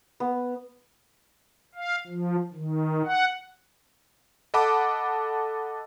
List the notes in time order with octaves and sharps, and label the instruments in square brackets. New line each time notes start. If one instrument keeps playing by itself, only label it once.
[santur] B3
[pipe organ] F5
F3
D#3
F#5
[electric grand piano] A4 D#5 F#5 A5 B5 D6